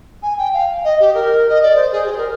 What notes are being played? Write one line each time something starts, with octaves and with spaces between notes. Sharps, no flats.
G#5
G5
F5
D#5
G4
A#4
D#5
D5
C5
G#4
G4
C5
A#4